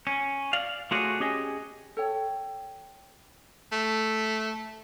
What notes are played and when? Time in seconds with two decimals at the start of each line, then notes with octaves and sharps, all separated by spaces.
0.07 C#4
0.53 D5 F5
0.91 A3 F4 F#4 G#4 C#5 D5
1.20 C#4 G4 G#4 C#5 D#5
1.97 A4 C#5 G5
3.72 A3